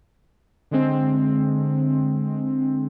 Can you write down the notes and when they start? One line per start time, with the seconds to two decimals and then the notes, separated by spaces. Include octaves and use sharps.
0.71 D3 G#3 C4